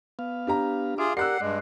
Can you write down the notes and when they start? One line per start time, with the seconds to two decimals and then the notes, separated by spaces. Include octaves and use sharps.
0.19 B3 F5
0.47 D4 G4 A#5
0.98 F4 G#4 E5 F5 D6
1.17 G4 A#4 D5 F#5 E6 F#6 C7
1.41 G2 G#3 D5